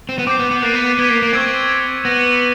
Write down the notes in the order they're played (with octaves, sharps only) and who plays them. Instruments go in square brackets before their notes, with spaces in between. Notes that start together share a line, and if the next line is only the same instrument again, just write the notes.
[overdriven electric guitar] C4
B3
[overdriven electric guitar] C4 [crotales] D6 G6 C7
[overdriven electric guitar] B3
B3
[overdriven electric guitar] A#3 [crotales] F#6 A6 C7 D#7
[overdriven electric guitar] B3
[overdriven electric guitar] B3 [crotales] G#6 B6 D7 G7
[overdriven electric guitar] A#3
A#3
[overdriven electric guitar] C4 [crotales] C#6 E6 G#6
[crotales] G#6 C#7 F7
[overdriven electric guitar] B3 [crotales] E6 G6 A#6 D#7 F#7